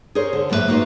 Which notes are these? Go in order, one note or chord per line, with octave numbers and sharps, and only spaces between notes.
G#4 A#4 C5 C#5
D3
F#2 A2 A#3 C#4 B4 E5
A#3 D#4 F#4 A4 B4 C5